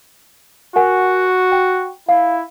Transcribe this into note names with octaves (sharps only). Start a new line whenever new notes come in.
F#4 A#4 F#5 G#5
G5
E4 F5